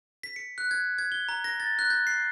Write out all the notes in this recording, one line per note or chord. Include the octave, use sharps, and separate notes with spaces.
B6
C#7
F#6
G#6
G#6
G7
A#5
A#6
A6
F#6
G6
C7